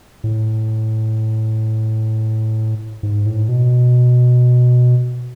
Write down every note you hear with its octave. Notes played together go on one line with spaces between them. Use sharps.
A2
G#2
A2
B2